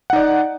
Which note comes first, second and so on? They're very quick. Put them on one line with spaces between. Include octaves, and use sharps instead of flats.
F#5 D#4 D5